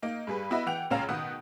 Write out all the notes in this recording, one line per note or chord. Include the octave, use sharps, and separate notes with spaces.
A#3 D#4
G2 G3 G#4 B4
B3 E4 F#4 B4 D#5 E5
E3 F#5 G5 F7
C#2 A#2 C#4 F5 A#5 E7
B2 D#3 B3 F#5 D#6